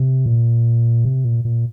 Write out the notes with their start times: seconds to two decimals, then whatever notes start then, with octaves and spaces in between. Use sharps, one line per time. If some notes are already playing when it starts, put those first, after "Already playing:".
Already playing: C3
0.26 A#2
1.05 C3
1.25 A#2
1.45 A#2